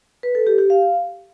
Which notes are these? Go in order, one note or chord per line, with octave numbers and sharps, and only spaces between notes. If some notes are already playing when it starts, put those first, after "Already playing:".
B4
A4
G4
G4
F5